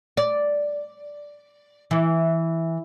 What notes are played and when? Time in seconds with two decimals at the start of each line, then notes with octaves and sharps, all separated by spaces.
0.17 D5
1.91 E3